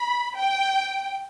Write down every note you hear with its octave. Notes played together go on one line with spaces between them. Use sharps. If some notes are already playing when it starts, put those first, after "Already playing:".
Already playing: B5
G5